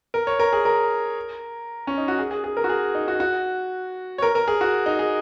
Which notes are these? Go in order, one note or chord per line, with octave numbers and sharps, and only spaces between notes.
A#4
C#5
A#4
G#4
A#4
C#4
D#4
F#4
G#4
G#4
G#4
A#4
F#4
G#4
D#4
F#4
F#4
C#5
A#4
A#4
G#4
F#4
D#4
G#4